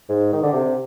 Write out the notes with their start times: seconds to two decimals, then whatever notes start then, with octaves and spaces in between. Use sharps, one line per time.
0.09 G#2
0.33 D#3
0.43 D3
0.53 C3